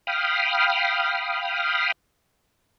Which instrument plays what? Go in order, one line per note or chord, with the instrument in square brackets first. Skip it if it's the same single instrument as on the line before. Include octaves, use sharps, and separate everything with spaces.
[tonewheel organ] F5 G5 B5 D#6 F6